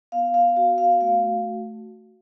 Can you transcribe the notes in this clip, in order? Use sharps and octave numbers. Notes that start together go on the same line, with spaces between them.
B3 F5
F5
F#4 F5
F5
A3 F5